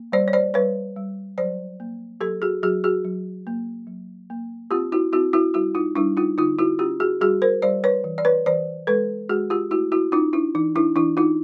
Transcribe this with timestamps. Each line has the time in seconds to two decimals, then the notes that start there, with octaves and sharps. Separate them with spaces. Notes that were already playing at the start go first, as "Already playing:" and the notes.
Already playing: A#3
0.12 G3 C5 D5
0.28 C#5
0.33 C5 D5
0.54 G3 B4 C#5
0.96 G3
1.38 F#3 C5 D5
1.80 A#3
2.21 F#3 G4 A4
2.42 F#4 G#4
2.62 F#3 F#4 G#4
2.84 F#4 G#4
3.05 F#3
3.47 A#3
3.87 F#3
4.30 A#3
4.71 C4 F4 G4
4.92 E4 F#4
5.13 C4 E4 F#4
5.33 E4 F#4
5.54 G3 E4 F#4
5.75 D#4 F4
5.96 G3 D4 E4
6.17 D#4 F4
6.38 D3 D#4 F4
6.59 E4 F#4
6.79 C#4 F4 G4
7.00 F#4 G#4
7.21 G3 F#4 G#4
7.42 A#4 C5
7.62 G3 C5 D5
7.84 B4 C#5
8.04 E3
8.18 D5
8.25 B4 C#5
8.46 E3 C5 D5
8.87 G#3 A4 B4
9.29 G#3 F#4 G#4
9.50 F4 G4
9.71 A3 E4 F#4
9.92 E4 F#4
10.12 C#4 D#4 F4
10.33 D4 E4
10.55 E3 D#4
10.76 D4 E4
10.96 E3 D4 E4
11.17 D#4 F4